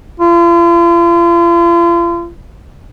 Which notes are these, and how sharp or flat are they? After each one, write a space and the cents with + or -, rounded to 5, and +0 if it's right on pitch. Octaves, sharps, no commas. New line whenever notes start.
F4 -40